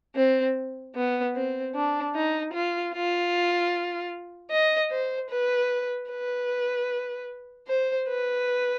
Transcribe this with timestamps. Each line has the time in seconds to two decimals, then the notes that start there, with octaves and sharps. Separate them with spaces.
0.16 C4
0.95 B3
1.35 C4
1.75 D4
2.15 D#4
2.53 F4
2.93 F4
4.51 D#5
4.91 C5
5.31 B4
6.10 B4
7.68 C5
8.08 B4